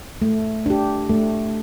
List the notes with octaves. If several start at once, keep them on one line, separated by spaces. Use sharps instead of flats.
A3
D4 G4
A3